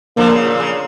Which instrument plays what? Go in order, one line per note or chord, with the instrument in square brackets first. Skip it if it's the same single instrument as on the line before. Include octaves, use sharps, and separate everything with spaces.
[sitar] D3 F3 [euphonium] A#3
[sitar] C#3
A#2
C#3